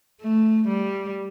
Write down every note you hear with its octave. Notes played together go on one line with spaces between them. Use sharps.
A3
G3